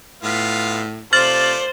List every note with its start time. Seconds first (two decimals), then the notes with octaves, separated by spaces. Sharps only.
0.23 A2 B3 F4 F5
1.13 C3 A3 F4 C5 D5 F6 A6 F#7